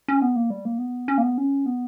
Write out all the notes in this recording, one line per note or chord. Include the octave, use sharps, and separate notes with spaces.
C#4
B3
A#3
G3
A#3
B3
C#4
A#3
B3
C#4
B3